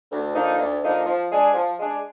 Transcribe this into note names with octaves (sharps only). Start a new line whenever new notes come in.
D2
D3 F3 A#3 D#4
D2
D3 F3 A#3 D#4
F3
G#3 D4 G#4
F3
G#3 D4 G#4